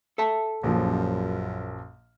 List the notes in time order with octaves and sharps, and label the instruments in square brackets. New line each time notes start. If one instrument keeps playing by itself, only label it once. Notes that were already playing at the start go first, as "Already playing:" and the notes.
[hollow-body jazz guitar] A4 E5 A5
[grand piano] A#1 F3 [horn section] F#2